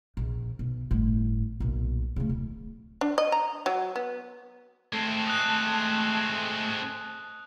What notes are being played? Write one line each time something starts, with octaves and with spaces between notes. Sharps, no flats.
A#1
B1
G1 A2
B1 A#2
C#3 A3
D1
D4
D#5
A#5
F#3
B3
G#3 A3 C4 A5
D#6 F#6